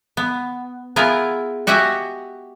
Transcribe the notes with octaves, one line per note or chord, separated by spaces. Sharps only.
B3
B3 E4 F4 G#4 A#4
F#4 G4 D#5 E5 F#5 G#5